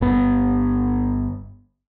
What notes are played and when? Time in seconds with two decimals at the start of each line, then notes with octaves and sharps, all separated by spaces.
0.01 G1 B3